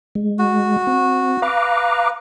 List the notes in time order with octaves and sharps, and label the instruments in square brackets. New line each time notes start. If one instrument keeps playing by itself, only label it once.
[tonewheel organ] G#3
[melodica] F#4
[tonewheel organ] C4
[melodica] B4 [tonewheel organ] F5 A#5 D6